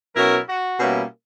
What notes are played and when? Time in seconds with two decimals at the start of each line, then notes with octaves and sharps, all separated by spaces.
0.16 B2 F#3 C#4 E4 F#4 A#4
0.48 F#4
0.80 B2 G3 A#3 C#4 E4